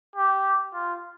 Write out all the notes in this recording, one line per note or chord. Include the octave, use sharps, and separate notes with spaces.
G4
F4